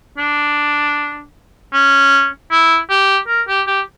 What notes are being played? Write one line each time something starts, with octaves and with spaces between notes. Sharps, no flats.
D4
C#4
E4
G4
A#4
G4
G4